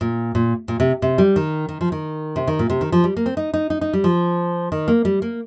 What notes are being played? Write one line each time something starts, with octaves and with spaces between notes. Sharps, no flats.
A#2
A#2
A#2
C3
C3
G3
D#3
D#3
F3
D#3
C3
D#3
A#2
C3
D#3
F3
G3
A#3
C4
D#4
D#4
D#4
D#4
G3
F3
D#3
A#3
G3
A#3